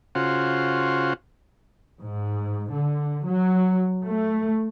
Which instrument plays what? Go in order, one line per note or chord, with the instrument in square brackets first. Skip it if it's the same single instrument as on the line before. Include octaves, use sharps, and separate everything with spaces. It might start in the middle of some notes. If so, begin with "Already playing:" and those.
[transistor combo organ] C#3 F4 F#4 C5
[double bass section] G#2
D3
F#3
A3